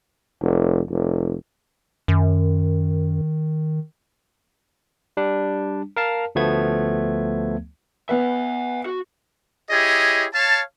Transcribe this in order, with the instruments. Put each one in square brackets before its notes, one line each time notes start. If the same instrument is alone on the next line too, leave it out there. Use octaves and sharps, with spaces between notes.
[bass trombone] F1
F1
[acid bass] F#2 [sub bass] D#3
[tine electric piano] G3 D4
A#4 F5 A5
D2 F3 A3 B3 G#6
[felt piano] B3 B4 [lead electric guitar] E5 F#5
[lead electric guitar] F#4
[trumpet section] E4 G4 G#4 C#5 D#5
C#5 F5 A5